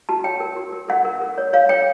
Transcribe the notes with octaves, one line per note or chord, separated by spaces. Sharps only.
F#4 A5
C#5 G5
A#4
F#4
A#4
A#4 F#5
A#4
A#4
C#5
C#5 F5
C#5 G5